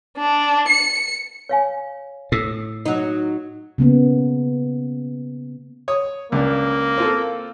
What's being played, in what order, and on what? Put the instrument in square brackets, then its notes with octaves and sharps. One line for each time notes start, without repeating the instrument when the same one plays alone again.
[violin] D4
C#7
[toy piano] C#5 F5 G#5
[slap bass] A2 [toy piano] A4 E6
[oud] F#3 D#4
[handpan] C#3 A#3 B3
[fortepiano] C#5 D#6
[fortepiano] C#2 C#3 D4 [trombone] A#3
[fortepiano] C4 F4 A4